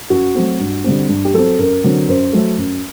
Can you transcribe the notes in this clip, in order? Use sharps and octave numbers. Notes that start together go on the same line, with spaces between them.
F#2 F#4
F#3 A3 C4
G2
D3 G3 C4
G2
G4
F#3 C4 A4
F#2 A#4
D3 F#3 C4
F#2 C5
F#3 A3
F#2